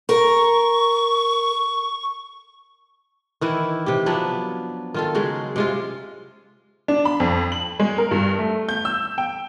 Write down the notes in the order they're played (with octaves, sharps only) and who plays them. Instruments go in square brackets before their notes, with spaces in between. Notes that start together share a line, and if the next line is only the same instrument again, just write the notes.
[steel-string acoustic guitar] A#4 [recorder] C#6
[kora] D#3 E3 E4
C3 G4
F3 F#3 B3 D4
D#3 F4 A4
C#3 F#3 G#3
C3 G#3 F4
[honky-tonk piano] D4
B5
F2
F#7
G#3
A#4
G2
A3
G6
E6
G5